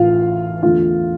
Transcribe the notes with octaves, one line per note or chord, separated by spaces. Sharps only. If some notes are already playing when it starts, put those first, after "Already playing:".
Already playing: A1 A2 F4 F5
E2 D3 A3 F4 F5